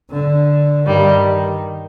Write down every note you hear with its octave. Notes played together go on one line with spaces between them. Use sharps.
D3
G2 D#3 G3